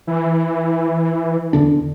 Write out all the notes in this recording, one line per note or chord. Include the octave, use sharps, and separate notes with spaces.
E3
E2 D3 D4